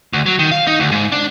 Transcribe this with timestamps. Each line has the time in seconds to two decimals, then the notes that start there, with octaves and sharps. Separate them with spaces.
0.13 D2
0.26 F#3
0.39 D#3
0.51 F5
0.67 D#4
0.80 D2
0.91 G#2
1.12 D4